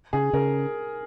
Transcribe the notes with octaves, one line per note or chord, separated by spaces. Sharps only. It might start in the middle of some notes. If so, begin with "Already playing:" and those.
C#3 G#4
C#3 A#4